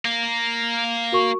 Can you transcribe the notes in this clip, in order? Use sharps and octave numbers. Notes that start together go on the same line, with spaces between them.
A#3
F#4 A#4 C#6